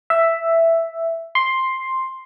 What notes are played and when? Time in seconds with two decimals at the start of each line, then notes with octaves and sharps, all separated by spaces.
0.10 E5
1.35 C6